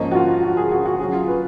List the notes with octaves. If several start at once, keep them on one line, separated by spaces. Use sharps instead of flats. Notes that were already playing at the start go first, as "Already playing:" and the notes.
Already playing: G#2 F3 A#3 C#4 D#5
F#4
F4
F#4
G#4
F#4
F#4
C#3 F#3 C#4 G#4
F4
B4